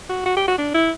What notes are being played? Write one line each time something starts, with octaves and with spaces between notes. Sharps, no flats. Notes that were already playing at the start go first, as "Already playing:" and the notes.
F#4
F#4
G4
F#4
D4
E4